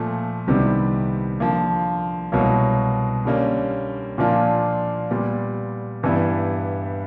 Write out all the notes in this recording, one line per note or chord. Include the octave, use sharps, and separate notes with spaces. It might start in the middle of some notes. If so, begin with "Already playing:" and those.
Already playing: A#2 F3 A3
C2 C3 D#3 G3 B3
D3 F3 A#3
C2 B2 F#3 A#3
D3 G3 A#3 C#4
A#2 F3 A#3 D4 F4
A#2 G3 B3
G2 E3 G3 B3 E4